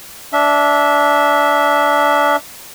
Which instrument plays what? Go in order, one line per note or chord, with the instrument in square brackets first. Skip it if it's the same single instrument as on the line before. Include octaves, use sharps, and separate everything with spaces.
[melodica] D4 E5